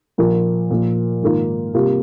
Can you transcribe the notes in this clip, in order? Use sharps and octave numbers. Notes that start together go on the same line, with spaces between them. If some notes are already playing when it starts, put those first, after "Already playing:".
A#2 F3 A#3 F4
A#2 F3 A#3
G#2 D#3 A#3 F4
C3 G3 A#3 F4